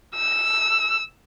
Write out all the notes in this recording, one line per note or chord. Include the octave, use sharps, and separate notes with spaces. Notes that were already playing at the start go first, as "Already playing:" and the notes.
E6